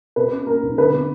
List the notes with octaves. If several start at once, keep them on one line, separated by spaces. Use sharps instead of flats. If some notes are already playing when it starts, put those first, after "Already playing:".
B2 B4
C#4
A#3 A#4
B1
D3 B4
B3